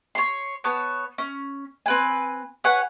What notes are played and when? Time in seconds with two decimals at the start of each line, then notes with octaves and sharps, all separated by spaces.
0.15 C#5 C6
0.64 B3 C#5 A5
1.18 C#4
1.86 C4 B4 G#5
2.64 B4 C#5 F#5 G#5